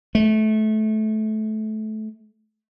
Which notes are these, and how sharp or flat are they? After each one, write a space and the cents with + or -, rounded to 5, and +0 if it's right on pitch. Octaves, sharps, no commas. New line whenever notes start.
A3 -25